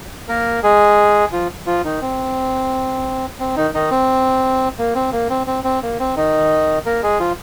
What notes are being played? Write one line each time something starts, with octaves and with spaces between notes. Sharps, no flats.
A#3 A#4
G#3 G#4
F3 F4
F3 F4
D#3 D#4
C4
C4
D#3 D#4
D#3 D#4
C4
A#3
C4
A#3
C4
C4
C4
A#3
C4
D#3 D#4
A#3 A#4
G#3 G#4
F3 F4